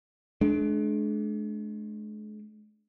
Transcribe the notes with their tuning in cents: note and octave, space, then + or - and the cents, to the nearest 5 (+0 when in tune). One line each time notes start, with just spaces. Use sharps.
G#3 +45 D4 +0